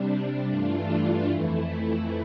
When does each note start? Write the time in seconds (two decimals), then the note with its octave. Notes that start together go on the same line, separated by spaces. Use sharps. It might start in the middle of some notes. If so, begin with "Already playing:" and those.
Already playing: C3 G3 D4
0.47 G2 E3 A3 D4 F4
1.29 F2 E3 A3 E4